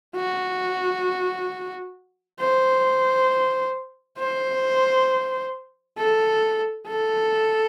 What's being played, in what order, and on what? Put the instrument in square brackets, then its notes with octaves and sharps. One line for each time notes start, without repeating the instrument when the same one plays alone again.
[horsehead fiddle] F#4
C5
C5
A4
A4